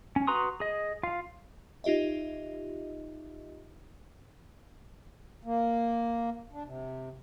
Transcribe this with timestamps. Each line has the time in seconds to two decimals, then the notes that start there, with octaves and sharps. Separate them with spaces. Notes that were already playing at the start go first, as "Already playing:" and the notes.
0.16 C#4
0.27 F#4 B4 A#5 C6 D#6
0.60 G#4 D#5
1.03 F4 F5
1.84 D#4 F4 G4 D#5 E5
5.45 A#3
6.53 D4
6.65 C3